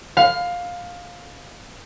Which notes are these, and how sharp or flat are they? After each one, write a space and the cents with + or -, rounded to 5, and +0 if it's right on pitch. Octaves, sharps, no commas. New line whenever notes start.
F5 +15 B5 +45